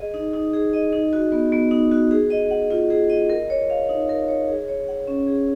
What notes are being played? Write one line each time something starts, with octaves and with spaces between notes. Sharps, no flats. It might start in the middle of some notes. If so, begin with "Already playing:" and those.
Already playing: G#4 D#5
D#4
D#4
G#4
D#5
D#4
F#4
B3
B3
D#4
F#4
G#4
D#5
F#5
F4
G#4
D#5
A#4
C#5
F5
D#4
A#4
C#5
G#4
C#5
F#5
C#4
G#4